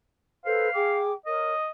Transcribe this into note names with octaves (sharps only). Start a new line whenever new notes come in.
A4 B4 C5 F5
G#4 G5 D6
A#4 C#5 D#5